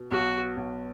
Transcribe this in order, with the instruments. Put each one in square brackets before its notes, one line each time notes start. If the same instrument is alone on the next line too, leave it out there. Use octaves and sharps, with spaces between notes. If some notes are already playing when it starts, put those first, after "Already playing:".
Already playing: [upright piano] B2
[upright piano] B1 [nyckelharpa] F#4
[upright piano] B1